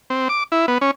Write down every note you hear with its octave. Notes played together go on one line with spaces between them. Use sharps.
C4
D6
E4
B3
C#4